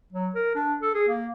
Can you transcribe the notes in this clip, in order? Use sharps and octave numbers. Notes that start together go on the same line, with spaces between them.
F#3
A#4
D4
A4
G#4
A#3